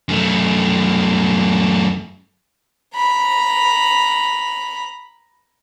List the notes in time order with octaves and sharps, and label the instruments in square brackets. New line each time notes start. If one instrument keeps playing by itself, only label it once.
[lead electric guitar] F#2 A3
[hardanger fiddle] A#5 B5